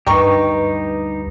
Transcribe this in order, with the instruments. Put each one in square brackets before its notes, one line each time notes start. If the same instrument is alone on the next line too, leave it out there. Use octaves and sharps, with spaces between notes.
[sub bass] D2 [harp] G2 [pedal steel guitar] D#4 G4 [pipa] A#4 G5 C#6